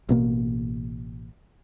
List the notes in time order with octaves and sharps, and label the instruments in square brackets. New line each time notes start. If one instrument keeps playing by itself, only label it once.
[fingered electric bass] A1 B2 A#3